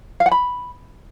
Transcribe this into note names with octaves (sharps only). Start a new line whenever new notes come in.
F5
F#5
B5